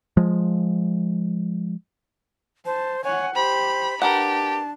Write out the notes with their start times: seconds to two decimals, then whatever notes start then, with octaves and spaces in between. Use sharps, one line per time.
0.17 F3 G#3
2.66 C5 A5
3.04 C#5 F#5 G#5
3.35 G4 C5 B5
4.02 D4 G4 A#4 B4 F#5 A5